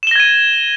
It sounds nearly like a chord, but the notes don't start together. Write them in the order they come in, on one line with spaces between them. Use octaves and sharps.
E7 G7 A#6 G#6 D#7